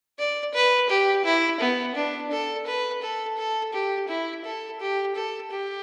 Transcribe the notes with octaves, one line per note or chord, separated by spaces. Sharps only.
D5
B4
G4
E4
B3
D4
A4
B4
A4
A4
G4
E4
A4
G4
A4
G4